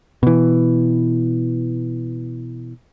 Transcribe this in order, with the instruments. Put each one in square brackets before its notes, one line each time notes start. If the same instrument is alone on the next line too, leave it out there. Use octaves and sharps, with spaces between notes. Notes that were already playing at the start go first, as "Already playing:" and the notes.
[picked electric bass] B2 E3